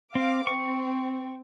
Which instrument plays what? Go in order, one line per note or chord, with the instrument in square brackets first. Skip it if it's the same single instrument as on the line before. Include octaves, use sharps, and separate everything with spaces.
[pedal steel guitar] C4 [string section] F5 D6
[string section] C4 [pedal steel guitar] C#6